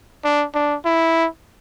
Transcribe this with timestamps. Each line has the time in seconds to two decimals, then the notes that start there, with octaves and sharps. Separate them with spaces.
0.25 D4
0.55 D4
0.85 E4